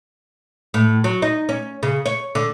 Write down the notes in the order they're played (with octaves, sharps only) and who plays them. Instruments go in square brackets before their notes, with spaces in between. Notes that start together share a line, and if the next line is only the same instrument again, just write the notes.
[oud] A2
F#3
D#4
C#4
C#3
C#5
D3